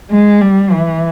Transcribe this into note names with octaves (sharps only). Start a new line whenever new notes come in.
G#3
G3
E3